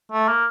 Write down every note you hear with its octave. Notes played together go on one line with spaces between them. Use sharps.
A3
A#3